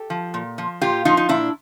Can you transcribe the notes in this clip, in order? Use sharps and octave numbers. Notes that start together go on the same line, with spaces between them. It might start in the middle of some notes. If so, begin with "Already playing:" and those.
Already playing: G4 A4
F3
A#2
F3
A#2 F4 G4
F3 D#4 F4
D#4
A#2 D4 E4